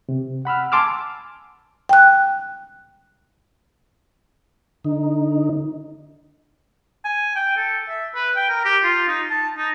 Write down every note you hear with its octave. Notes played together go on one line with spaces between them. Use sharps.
C3
F#5 B5 E6 F6
G#5 A5 C6 D6 E6 F6
G5 F#6
D3 D#4
G#5
G5
A4
E5
B4
G5
A#4
G4
F4
D#4
A5
D#4